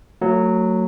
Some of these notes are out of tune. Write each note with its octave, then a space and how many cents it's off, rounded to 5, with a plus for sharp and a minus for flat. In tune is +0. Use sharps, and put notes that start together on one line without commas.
F#3 +0 A3 +35